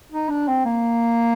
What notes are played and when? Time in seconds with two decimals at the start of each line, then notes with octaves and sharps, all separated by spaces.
0.12 D#4
0.29 D4
0.47 C4
0.65 A#3